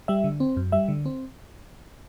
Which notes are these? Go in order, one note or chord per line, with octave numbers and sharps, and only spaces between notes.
G3 E5
D3
C4
F#2
G3 E5
D3
C4